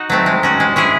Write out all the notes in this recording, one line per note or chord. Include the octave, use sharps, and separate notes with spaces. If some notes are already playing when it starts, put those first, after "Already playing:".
Already playing: D#4 F#4
F#3 A3 C4
G#3
C#4 F#4
G#3
C#4 E4 G#4